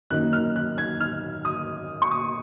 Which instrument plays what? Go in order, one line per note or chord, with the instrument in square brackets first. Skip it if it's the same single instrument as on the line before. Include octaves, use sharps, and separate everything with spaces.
[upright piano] F#2 D#3 A#3 D#4 F#6
F6
F#6
G#6
F6
D#6
C#6
D#6